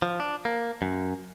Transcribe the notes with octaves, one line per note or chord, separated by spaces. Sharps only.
F3
D4
A#3
F#2